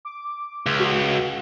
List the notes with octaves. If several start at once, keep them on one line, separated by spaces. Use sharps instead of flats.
D6
C#2
F#4